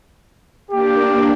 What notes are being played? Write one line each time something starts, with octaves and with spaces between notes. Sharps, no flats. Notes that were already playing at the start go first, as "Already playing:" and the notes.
A#3 D4 G4